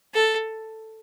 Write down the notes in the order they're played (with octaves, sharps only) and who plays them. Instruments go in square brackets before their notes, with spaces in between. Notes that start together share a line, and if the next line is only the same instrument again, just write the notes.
[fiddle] A4